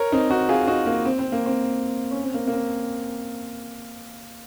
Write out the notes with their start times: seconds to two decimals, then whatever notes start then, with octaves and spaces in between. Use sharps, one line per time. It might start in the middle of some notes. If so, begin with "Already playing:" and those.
Already playing: A#4 C#5
0.12 C4 D#4
0.30 D#4 F#4
0.49 F4 G#4
0.67 D#4 F#4
0.86 A#3
1.05 C4
1.19 C4
1.32 A#3
1.46 C4
2.11 C#4
2.23 C4
2.34 A#3
2.47 A#3
2.53 C4